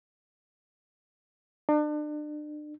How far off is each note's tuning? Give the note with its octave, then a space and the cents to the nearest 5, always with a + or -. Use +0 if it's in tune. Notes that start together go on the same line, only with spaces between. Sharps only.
D4 +35